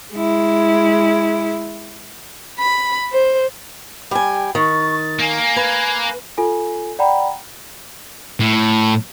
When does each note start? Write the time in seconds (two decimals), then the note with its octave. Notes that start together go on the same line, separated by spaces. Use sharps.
0.13 G#3 E4
2.60 B5
3.13 C5
4.11 G3 G5 G#5
4.55 D#3 C#6 A6
5.19 A#3 G#5
5.56 B4 G#6
6.38 F4 A4 G#5
6.99 D5 F#5 G5 A#5 B5
8.40 A2